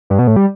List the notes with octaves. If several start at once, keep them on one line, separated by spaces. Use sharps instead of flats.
G2
B2
A2
G3